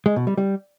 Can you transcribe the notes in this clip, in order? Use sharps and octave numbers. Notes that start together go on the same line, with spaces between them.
G#3
B2
G3
G3